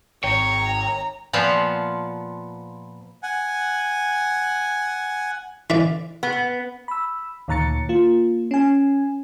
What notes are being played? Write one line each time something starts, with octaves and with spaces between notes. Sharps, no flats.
G#1 C#5 G5 A#5
A#2 F3 B3 F5 A5
F#5 G#5
E3 D5
B3
B5 E6
D2 A#2 D#3 A#5 A6 C#7
A#3 F4
C#4 G#5